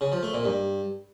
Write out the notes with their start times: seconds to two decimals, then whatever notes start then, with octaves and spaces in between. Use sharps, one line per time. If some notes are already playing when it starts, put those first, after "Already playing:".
0.01 C#3
0.12 F3
0.23 A3
0.34 A#2
0.44 G2